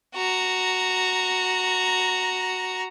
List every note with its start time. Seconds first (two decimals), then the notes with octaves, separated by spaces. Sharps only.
0.15 F#4 A#5